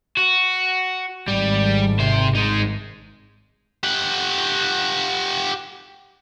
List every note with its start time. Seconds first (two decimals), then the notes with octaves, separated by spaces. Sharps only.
0.17 F#4
1.28 G#1 G3
2.00 C3 C5
2.35 G#3 D#4
3.84 G4 F#5